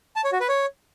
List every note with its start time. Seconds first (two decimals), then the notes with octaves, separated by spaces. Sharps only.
0.16 A5
0.24 C#5
0.32 F#4
0.40 B4
0.49 C#5